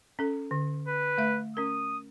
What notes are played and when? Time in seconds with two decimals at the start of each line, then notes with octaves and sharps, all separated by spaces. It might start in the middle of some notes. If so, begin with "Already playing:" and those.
0.19 C#4 A4
0.51 D3
0.88 B4
1.18 A3 E5
1.57 C#4 A#4 D#6